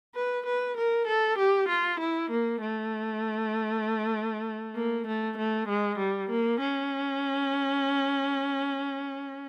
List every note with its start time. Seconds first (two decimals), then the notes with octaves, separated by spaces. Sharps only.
0.15 B4
0.46 B4
0.77 A#4
1.07 A4
1.38 G4
1.69 F4
2.00 E4
2.31 A#3
2.61 A3
4.75 A#3
5.07 A3
5.38 A3
5.68 G#3
5.98 G3
6.30 A#3
6.60 C#4